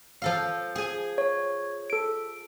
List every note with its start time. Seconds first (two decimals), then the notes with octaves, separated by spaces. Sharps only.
0.22 F3 A4 F5
0.75 G#4 G#5
1.18 C#5
1.90 A4 D7